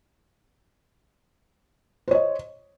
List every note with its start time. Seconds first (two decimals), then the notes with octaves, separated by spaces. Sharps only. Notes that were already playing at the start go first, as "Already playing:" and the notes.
2.08 C5
2.11 C#5
2.15 D#5